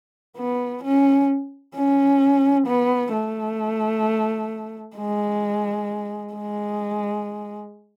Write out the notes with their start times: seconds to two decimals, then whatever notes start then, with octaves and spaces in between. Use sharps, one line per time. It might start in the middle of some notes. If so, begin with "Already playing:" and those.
0.37 B3
0.83 C#4
1.75 C#4
2.67 B3
3.12 A3
4.96 G#3
6.34 G#3